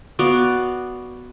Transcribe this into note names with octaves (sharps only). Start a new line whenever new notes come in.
B3 F#4 D5 F5